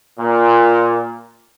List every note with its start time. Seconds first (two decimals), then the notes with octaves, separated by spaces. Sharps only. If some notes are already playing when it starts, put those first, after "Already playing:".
0.19 A#2